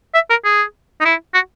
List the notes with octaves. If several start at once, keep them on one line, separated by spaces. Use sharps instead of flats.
E5
A#4
G#4
D#4
E4
F#4